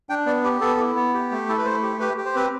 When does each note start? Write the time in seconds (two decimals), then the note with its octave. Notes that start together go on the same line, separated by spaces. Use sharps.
0.09 D4 G5
0.26 B3 D5
0.43 G4 B4
0.61 B3 A4
0.79 E4
0.96 B3
1.14 G4
1.32 A3
1.49 E4 A4
1.58 B4
1.65 A3 C5
1.83 G4
2.00 G4 B4
2.17 G4
2.25 C5
2.35 C4 B4